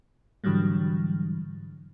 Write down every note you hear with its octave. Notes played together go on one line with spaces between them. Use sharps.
G#2 D3 E3 F#3 G3